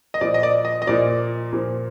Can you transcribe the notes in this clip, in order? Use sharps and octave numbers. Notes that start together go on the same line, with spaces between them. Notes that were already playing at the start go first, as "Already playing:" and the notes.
D#5
A#2 F3 D5
D#5
D5
D#5
D#5
A#2 F3 D5
A#2 F3